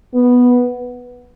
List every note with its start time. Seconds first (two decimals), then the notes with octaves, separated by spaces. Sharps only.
0.14 B3